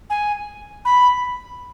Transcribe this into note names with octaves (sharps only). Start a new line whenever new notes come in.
G#5
B5